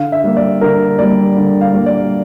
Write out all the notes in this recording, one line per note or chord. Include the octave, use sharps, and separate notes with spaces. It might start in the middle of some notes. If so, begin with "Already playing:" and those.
Already playing: D3 F5
E5
G3 A#3
D5
D3 A#4
G3 A#3 D5
D3
F5
G3 A#3
D5